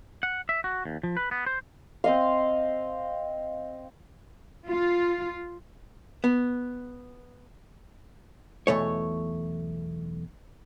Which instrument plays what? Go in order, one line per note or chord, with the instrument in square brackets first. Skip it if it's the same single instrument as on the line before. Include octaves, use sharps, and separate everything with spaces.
[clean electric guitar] F#5
E5
F#4
D#2
F3
B4
B3
C5
[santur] C4 D#5 F5
[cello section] F4
[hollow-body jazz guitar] B3
B1 E2 A3 C#5